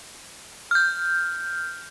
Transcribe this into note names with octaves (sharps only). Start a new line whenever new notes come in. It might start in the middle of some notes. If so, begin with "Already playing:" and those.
F6 G6